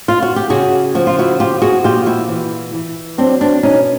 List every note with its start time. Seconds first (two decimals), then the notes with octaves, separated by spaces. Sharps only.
0.08 F4
0.22 F#4
0.36 G4
0.50 C#3 F#4 G#4
0.95 F3 F#4
1.07 F4
1.19 E4 F#4
1.40 F3 F4 G4
1.62 F#4 G#4
1.84 A#2 F4 G4
2.06 E4 F#4
2.29 E3
2.74 E3
3.18 F#3 C4 D4
3.41 C4 D4
3.63 B2 C#4 D#4